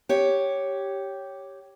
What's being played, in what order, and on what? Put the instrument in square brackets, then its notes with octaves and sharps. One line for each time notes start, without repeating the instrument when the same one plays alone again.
[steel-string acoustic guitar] G4 C#5